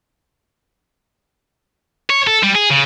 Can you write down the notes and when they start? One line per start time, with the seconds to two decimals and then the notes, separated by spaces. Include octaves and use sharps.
2.10 C#5
2.27 A4
2.43 G3
2.55 G#4
2.70 C#3